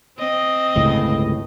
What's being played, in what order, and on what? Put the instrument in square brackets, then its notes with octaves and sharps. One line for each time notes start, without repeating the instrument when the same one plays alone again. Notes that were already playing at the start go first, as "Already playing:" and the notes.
[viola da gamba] C4 D#5
[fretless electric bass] G1 C#2 A2